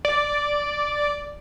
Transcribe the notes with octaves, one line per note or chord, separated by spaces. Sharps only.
D5